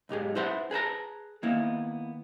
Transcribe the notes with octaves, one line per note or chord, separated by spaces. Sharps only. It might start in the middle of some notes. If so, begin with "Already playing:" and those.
B1 G#2 G4 G#4
E4 B4 C5 E5 F#5
G#4 B4 A5 A#5
D#3 A#3 B3 E4